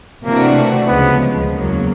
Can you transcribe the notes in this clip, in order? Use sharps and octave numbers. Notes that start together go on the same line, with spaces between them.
C3 E3 A3 A#3 D4 F#4
D2 C#3 F3 G#3 B3
E2 C#3 F#3 A#3